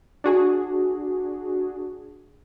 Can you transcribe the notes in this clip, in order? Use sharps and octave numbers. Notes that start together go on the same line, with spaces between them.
D4 F#4 G#4